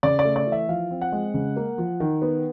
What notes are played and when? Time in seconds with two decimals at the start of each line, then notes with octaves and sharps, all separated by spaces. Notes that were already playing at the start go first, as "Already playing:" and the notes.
0.03 C#3 D5
0.19 D5
0.25 A3
0.36 D5
0.47 E3
0.52 E5
0.69 F3 F5
0.91 C4
1.01 F#5
1.12 G#3
1.34 C#3
1.56 A#3
1.78 F3
2.00 D#3
2.22 B3